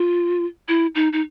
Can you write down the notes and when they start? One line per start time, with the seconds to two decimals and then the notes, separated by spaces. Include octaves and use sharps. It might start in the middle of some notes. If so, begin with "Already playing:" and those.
Already playing: F4
0.68 E4
0.95 D#4
1.13 D#4